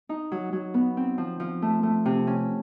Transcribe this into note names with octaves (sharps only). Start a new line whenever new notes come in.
D#4
F#3
F#3
B3
C4
F3
F3
A3
A3
C3
C#4